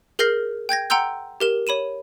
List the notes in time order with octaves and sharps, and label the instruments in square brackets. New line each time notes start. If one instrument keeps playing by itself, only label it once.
[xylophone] G#4 A#4 F6 G6 A#6 C7
G5 G6 G#6 A#6
F#5 G5 A#5 C6 E6 G6
G4 A#4 E7
C#5 B5 D#7 E7